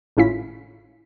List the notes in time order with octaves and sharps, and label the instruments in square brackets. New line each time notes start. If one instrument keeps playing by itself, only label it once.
[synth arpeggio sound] G#1 A2 C#4 E4 F4 B6